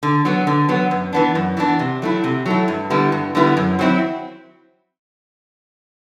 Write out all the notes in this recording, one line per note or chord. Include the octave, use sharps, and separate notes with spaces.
D3
F#3 B3
D3
F#3 B3
F#2
E3 B3 D4
F#2
E3 B3 D4
C3
F#3 A3 E4
C3
F#3 A3 E4
G2
D3 G3 B3 E4
G2
D3 G3 B3 E4
F#2
F#3 C4 E4